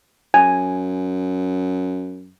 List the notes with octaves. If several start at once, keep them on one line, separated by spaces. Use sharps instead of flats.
F#2 G#5